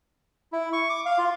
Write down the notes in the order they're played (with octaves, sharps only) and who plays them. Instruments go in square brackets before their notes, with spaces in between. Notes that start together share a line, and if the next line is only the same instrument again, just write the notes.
[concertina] E4
C#6
D6
F5
F4